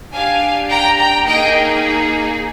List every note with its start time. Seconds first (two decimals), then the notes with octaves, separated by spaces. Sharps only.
0.13 D4 G4 F5 G#5
0.69 G5 A#5
0.99 G5 A#5
1.26 A#3 D#4 G#4 D#5 G5